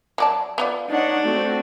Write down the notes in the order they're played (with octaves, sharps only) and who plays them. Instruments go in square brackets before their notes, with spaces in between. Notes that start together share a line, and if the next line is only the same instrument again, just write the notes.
[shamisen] F#3 D5 A5
B3 F4 D5
[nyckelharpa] D4 [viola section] D#4 C#5 F#5
[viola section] A3 C4 F#4